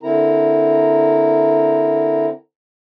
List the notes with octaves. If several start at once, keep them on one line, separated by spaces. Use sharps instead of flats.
D3 C4 E4 A#4 A#5